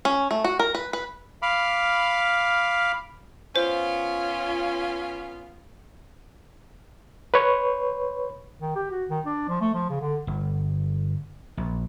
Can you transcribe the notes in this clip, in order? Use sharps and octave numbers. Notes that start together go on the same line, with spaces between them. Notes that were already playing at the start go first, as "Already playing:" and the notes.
C#4
A3
F#4
A#4
B4
B4
F5 B5 D6 F6
B3 C#4 F4 C5
B4 C#5
D#3
G4
F#4
D#3
D4
F3
A3
F3
C#3
D3
G1
A#1